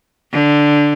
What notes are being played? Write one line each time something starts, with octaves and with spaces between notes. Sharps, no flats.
D3